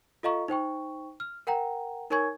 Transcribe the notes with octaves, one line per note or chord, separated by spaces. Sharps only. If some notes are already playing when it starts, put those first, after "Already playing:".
F4 A4 D#5 F5 A#5 C#6
D#4 C5 G5 C#6
F6
A#4 F#5 G5 A#5
D#4 A#4 C#5 G#5 C#6 G#6